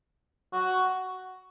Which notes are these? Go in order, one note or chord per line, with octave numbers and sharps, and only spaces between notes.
F#4